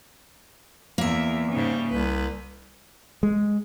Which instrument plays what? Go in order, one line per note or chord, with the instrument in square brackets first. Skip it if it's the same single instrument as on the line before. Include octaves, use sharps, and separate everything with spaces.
[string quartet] E2 [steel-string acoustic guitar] A#3 E5
[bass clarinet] G#2 [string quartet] C#3 G3
[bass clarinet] C2 [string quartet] B4
[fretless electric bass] G#3